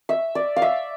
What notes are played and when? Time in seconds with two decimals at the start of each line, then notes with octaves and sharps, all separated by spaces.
0.09 E5
0.35 D5
0.56 F5
0.62 E5